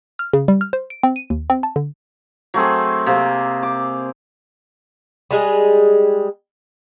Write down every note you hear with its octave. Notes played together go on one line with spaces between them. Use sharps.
F6
C#3
G3
F6
C5
D7
C4
D#7
D#2
C4
A5
D3
F#3 A3 C4 G#4
C3 A#3
D6
G3 G#3 G#4